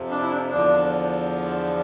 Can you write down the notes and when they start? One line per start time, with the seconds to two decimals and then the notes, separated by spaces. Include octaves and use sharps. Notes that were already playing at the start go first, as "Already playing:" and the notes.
Already playing: F2 C3 F3
0.10 D4
0.21 E4
0.32 D4
0.51 E2 D3 F3 D4